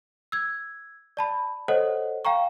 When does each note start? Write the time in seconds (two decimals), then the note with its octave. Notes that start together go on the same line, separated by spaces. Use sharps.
0.32 E6 G#6
1.17 D5 A5 B5
1.68 A4 C5 C#5 D#5 F#5
2.25 F5 G5 A#5 C#6